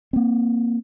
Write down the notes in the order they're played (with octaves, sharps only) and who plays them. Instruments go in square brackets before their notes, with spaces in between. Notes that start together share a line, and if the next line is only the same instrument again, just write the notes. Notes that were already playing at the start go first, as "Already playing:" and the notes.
[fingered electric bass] A#3 C4